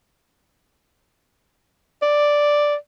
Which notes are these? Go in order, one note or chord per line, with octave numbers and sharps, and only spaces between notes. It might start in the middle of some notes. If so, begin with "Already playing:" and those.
D5